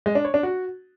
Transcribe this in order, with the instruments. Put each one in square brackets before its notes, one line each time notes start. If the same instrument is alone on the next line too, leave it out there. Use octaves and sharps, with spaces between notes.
[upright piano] G#3
D4
C#5
D4
F#4